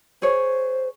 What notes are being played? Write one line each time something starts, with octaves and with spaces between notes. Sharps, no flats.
G#4 C5 C#5